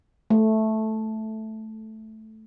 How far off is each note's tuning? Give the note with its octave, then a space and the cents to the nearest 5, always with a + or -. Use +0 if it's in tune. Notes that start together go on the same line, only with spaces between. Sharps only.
A3 -5